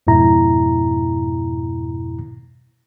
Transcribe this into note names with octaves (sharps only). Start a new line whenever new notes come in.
F2 G#2 B2 E4 A#5